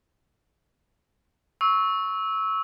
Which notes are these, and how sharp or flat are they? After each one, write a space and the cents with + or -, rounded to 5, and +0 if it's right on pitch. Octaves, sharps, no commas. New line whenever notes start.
C#6 +0 E6 -20